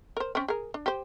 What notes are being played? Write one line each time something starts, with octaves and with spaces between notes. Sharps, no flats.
A#4 C5
C4 C#4
G#4 A#4
D4
G4 C5